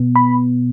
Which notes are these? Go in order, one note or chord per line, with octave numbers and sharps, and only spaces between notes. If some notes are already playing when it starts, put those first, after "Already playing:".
Already playing: B2 B3
B5